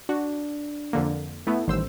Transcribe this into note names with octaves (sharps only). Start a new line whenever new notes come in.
D4 F#4
F2 D3 A#3
A3 B3 E4
A1 D#3 G3 C5 E6